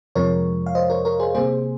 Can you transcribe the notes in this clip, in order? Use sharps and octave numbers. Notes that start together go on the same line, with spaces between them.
F2 C3 F3 G#3 A#4 C#5
F5
C5 D#5
A#4 C#5
A#4 C#5
G#4 C5
C3 G3 A#3 G#4 C5